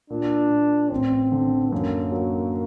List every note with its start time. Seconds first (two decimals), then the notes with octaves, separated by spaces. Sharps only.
0.10 A#2 D4
0.50 A#2
0.91 A1 C4
1.32 D3
1.72 F#2 A#3
2.12 F#3